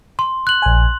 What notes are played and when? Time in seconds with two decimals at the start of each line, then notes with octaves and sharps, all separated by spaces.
0.19 C6
0.47 F#6 F#7
0.62 A#1 G#5